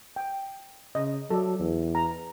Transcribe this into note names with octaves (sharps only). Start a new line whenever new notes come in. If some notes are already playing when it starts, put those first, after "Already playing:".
G5
C#3 D#5
F#3 A4 D5
E2
A#5